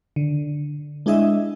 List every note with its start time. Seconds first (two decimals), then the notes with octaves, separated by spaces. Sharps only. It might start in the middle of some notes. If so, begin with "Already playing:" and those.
0.16 D3
1.06 G#3 D4 E4 G#4 D#5 E5